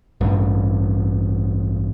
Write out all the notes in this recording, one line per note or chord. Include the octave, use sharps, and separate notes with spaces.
A1 G2